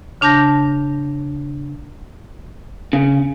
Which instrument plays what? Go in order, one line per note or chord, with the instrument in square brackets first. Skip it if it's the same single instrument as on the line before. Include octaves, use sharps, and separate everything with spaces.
[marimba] C#3 D4 A5 G6 A#6
[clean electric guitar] C#3